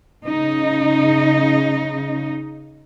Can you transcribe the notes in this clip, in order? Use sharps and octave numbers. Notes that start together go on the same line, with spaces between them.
C#3 D#4